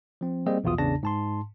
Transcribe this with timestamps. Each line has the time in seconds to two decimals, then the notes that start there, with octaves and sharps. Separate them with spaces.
0.21 F3 C4
0.46 G3 A#3 C4 G#4 D#5
0.64 A#1 E2 B2 F4 D#6
0.78 A1 E2 C#3 D4 A5 A#6
1.03 G#2 A5 C6